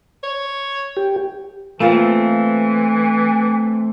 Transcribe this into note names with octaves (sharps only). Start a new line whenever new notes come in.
C#5
G4
E3 A3 A#3 C4 F4 B4